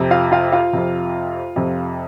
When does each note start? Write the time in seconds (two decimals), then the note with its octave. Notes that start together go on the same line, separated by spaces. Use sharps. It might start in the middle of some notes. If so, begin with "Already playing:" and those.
Already playing: F2 C3
0.11 F4 F5
0.32 F4 F5
0.52 F4 F5
0.73 F2 C3
1.56 F2 C3